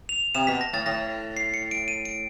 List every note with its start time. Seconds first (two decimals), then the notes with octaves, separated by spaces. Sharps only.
0.09 F7
0.35 C3 E7
0.47 B2 B6
0.61 A#6
0.73 A2 A6
0.86 A2 A#6
1.37 C7
1.54 C#7
1.71 D7
1.88 D#7
2.05 D7